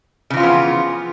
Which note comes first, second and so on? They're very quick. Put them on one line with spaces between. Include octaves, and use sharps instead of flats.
C#3 E3 F4 F3 B3